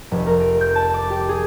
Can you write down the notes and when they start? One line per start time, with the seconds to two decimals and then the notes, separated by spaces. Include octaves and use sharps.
0.11 F1
0.26 A#4
0.40 D7
0.61 G6
0.76 A5
0.94 D6
1.10 G4
1.29 G#4